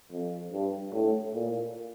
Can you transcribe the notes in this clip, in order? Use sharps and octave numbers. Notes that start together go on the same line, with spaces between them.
F2
G2
A2
A#2